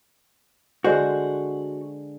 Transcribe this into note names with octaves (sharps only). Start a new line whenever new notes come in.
D3 G#3 F#4 C5